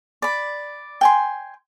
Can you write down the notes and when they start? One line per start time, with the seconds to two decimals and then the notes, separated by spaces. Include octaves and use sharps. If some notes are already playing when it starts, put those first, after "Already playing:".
0.22 D5 B5
1.01 G5 G#5 C6